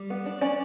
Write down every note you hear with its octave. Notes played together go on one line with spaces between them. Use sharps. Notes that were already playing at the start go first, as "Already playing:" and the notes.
Already playing: G3
B3
D4
C#4 D5